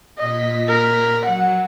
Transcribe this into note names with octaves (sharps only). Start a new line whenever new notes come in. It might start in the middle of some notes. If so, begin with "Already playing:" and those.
A#2 D#5 B6
A#4
F#3 F#5